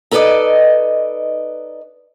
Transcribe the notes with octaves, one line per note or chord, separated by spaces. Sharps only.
D#4 A4 B4 C5 D5 D#5